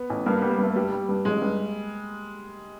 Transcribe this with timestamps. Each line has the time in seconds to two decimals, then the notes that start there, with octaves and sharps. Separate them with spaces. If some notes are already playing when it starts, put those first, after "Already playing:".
Already playing: B3
0.10 A1
0.26 G2 A#3
0.38 B3
0.42 G3
0.50 A#3
0.58 G2
0.63 A3
0.76 G2 G3
0.92 G3
1.09 G2
1.25 A1 G#3
1.42 G2